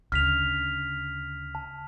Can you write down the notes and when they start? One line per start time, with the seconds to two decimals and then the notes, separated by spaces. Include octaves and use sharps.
0.12 D2 C#3 F6 B6 F7
1.55 A5